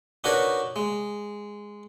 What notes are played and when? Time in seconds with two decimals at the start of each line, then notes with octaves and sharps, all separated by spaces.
0.24 D4 D#4 F#4 A#4 B4 C#5
0.76 G#3